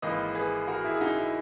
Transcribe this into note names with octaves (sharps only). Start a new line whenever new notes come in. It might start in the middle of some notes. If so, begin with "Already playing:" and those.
G#1 G#2 E3 A#3 B4 D#5
G#4 B4
F#4 A#4
E4 G#4
G#4
D#4 F#4
E4